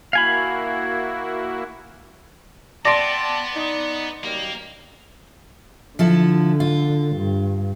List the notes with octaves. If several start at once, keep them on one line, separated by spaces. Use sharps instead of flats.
A#3 E4 F#4 F5 G#5 B5
B3 D5 E5 G5 A5 C6 A#6 D7
D#4
F#2 D#3 G3 A#3
D3 F3 E4 A4
F4
G2